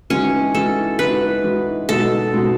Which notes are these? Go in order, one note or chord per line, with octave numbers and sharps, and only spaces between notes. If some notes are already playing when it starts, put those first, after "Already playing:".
E3 G#3 C#4 D#4 F#4
E3 G#3 D#4 F#4 A4
E3 G#3 D#4 F#4 B4
E3 G#3 D#4 F#4
B2 G#3 D#4 F#4 A4
B2 G#3 D#4 F#4